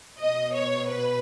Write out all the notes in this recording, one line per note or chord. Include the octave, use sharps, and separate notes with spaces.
B2 D#5
C#5
B4